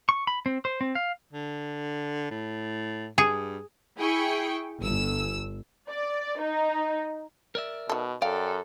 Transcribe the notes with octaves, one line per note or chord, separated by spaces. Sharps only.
C#6
B5
C4
C5
C4
F5
D3
A2
G2 G#4
E4 G#4 G5 C#6
G1 E6
D5
D#4
A#4 D5 E5
B2 D#3 A4
F#2 A4 D5 F5 G5